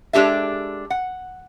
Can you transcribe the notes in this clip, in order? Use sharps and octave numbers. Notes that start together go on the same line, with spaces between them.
G#3 D4 G4 A4 E5
F#5